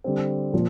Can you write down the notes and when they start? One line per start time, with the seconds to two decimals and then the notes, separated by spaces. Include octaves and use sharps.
0.04 D3 G3 C4
0.54 A#2 F3